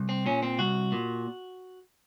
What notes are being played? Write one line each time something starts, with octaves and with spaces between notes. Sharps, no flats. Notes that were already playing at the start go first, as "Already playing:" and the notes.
Already playing: C2
C4
A#2 C#4
C4
C2 F#4
A#2